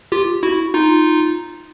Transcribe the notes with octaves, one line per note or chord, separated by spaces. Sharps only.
F4 G4
E4 F#4
D#4 F4